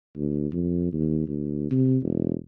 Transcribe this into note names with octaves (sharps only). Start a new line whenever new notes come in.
D2
F2
D#2
D2
C3
E1